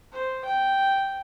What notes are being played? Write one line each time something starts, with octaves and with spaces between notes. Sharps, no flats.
C5
G5